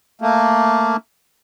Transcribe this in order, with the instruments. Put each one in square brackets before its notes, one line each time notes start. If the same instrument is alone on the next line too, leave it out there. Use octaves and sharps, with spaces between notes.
[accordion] A3 A#3